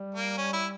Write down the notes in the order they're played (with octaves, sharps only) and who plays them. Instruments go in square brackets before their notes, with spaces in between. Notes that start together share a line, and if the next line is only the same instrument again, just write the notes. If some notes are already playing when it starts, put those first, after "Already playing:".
Already playing: [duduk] G3
[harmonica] A#3
C#4
E4